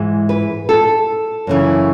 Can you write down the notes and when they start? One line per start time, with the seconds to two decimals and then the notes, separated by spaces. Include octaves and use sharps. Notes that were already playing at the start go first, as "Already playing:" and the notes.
Already playing: G#2 E3
0.29 B4
0.69 A4
1.47 F#2 C#3 E3